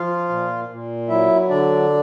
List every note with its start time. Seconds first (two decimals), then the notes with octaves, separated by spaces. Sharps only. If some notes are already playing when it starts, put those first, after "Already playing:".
Already playing: F3 F4 F5
0.29 A#2
0.69 A#2
1.09 F#3 E4 E5
1.49 D3 D4 D5